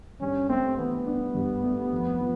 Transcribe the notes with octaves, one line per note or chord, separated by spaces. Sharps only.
G2 C#4
A3 C4
E3 B3
D4
G2
A3
F2
F3